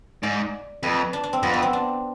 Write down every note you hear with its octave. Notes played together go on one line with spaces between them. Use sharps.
G#2 D5
F2 B4
D4
D4
C4
F2 B3
B3
C4
D4